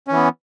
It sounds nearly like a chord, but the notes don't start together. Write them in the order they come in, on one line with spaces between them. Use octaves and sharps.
C#4 E3 B3